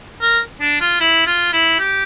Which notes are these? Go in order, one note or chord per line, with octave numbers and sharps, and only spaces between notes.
A#4
D4
F4
E4
F4
E4
G4